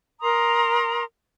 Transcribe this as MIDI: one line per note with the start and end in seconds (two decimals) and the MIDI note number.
0.21 1.04 70
0.21 1.04 82
0.21 1.04 84
0.21 1.04 87